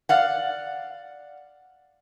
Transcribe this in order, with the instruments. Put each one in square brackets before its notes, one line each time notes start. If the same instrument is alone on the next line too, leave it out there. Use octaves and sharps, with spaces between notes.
[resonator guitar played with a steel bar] D5 F5 F#5